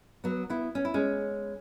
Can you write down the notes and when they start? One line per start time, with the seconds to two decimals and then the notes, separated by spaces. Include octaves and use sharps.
0.24 F#3 B3
0.50 B3 E4
0.75 C#4
0.85 E4
0.94 G#3 C#4